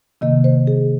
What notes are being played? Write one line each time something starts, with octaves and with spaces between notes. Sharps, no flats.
C3 D#3 A#3 D#5
C5
G#4